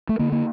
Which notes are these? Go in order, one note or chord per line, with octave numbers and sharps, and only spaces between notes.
A3
D3 A#3
A#3